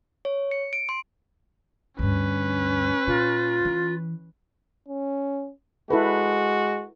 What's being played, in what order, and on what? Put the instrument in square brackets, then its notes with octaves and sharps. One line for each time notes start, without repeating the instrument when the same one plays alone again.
[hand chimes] C#5
C#7
D7
C6
[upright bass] D2 G2 [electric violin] C#4 B4
[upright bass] A#2 [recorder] F4
[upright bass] E3
[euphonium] C#4
[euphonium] G#3 [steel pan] E4 A4 B4 [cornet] F#4